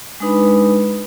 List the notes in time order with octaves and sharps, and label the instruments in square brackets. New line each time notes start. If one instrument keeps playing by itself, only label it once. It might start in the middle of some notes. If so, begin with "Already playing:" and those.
[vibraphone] G#3 D4 D#4 B4 B5